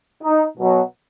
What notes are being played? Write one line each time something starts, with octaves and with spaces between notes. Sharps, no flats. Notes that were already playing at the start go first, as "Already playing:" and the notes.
D#4
B2 F#3